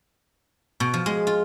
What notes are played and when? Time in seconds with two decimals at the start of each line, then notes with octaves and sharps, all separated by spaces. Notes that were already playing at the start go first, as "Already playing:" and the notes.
0.80 B2
0.94 F3
1.06 G#3
1.27 F4